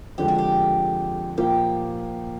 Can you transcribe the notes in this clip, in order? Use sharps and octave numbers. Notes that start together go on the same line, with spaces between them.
F2 D3 F3 G#3 G4
F#4
G4
A#2 F3 A#3 G4